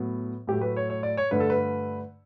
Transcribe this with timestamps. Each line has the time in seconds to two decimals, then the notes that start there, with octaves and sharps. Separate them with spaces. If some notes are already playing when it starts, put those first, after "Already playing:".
Already playing: A2 F#3 B3
0.47 A2 F#3 A3 G4
0.61 B4
0.76 C#5
0.90 C#5
1.03 D5
1.17 C#5
1.31 G2 D3 A3 B4
1.40 A4
1.50 B4